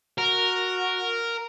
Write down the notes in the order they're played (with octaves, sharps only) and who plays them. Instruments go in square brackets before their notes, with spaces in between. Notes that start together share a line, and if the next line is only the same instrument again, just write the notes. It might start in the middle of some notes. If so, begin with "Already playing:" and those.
[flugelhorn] F#4 [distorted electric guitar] A#4